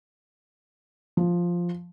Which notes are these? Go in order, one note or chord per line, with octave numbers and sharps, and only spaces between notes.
F3